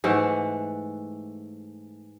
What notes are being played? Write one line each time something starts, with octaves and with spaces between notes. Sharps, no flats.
G#2 E3 A3 F#5